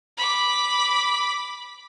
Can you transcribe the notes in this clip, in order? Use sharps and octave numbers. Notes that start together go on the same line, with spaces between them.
B5 D6